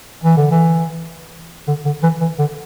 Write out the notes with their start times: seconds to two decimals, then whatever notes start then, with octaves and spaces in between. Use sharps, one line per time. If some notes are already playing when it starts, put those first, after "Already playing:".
0.24 E3
0.37 D3
0.51 E3
1.68 D3
1.85 D3
2.03 E3
2.21 E3
2.39 D3